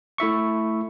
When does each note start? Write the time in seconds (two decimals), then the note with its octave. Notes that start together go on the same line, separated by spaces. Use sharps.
0.18 A3 E4 E5 C#6